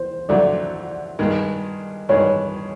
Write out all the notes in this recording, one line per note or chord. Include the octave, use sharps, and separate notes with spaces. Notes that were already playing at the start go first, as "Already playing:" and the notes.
Already playing: C5
F2 D3 F#3 A3 D5
G2 D#3 G#3
G2 D#3 G#3 C#5